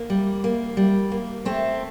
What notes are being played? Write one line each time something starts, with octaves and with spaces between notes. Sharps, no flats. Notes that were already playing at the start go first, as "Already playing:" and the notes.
Already playing: A#3
G3
A#3
G3
A#3
A3 C4